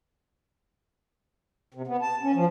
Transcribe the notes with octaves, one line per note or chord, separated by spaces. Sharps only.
C3
B3
A5
C#4
F3